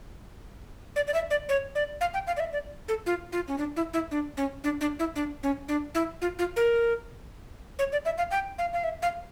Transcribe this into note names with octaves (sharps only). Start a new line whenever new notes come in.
D5
D5
E5
D5
C#5
D5
F5
G5
F5
D5
E5
D5
A4
F4
F4
C#4
D4
E4
E4
D4
C#4
D4
D4
E4
D4
C#4
D4
E4
F4
F4
A#4
C#5
D5
E5
F5
G5
F5
F5
E5
F5